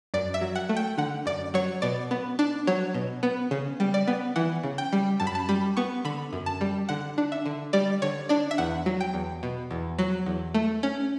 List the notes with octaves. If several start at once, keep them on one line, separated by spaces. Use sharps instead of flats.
F#2 D5
E5
F#3
F#5
A3
G5
D3 F#5
F#2 D5
F#3 C#5
B2 D5
B3
D4
F#3 C#5
B2
B3
C#3
G3
D5
B3
E3 F#5
C#3
G5
G3
F#2 A5
B5
A5
G3 B5
B3 C#6
D3 B5
F#2
A5
G3
D3 F#5
D4
E5
D3
G3 D5
D3 C#5
D4 D5
E5
E2 F#5
F#3
G5
E2
B2
E2
F#3
E2
A3
C#4